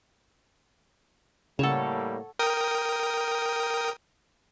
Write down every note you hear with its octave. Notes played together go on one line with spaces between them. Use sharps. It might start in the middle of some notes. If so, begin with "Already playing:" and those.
A2 C#3 G3 A#3 A4 C#5 F#5 E7
A#4 G5 D#6